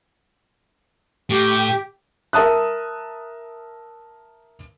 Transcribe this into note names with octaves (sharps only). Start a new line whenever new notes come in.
A2 G4
A#4 E5 A5 D#6 F#6